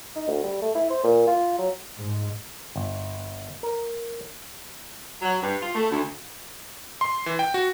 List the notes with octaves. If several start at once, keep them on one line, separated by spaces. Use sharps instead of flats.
D#4
D2
G3
A3
E4
C5
A#2
F4
F#3
G#2
G1
A#4
F#3
G2
F4
A3
D2
C6
E3
G5
F#4